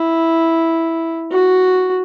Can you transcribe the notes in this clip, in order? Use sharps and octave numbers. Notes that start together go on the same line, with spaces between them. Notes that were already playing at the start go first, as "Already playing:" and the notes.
Already playing: E4
F#4